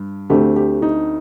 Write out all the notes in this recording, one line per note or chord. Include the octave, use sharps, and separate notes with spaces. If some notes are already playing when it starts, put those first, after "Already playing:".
Already playing: G2
D2 D3 A3 C4 G4
G4
D#4